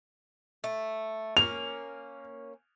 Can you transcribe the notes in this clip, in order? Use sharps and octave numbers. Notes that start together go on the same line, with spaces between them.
A3
A#3 C#4 F7